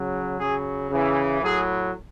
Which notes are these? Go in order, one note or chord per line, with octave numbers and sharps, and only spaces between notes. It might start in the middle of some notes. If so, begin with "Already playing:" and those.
Already playing: C#3 F#3
C#3 F#3 G#4
C#3 E3
A2 F#3 G#4